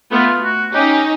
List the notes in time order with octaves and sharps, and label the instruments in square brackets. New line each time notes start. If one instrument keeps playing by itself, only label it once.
[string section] A3 B3 [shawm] F4
[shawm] F#4
[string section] C#4 D#4 [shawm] G4